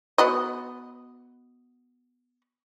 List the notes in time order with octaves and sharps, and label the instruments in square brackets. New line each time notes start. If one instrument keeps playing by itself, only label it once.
[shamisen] B3 F#4 D#5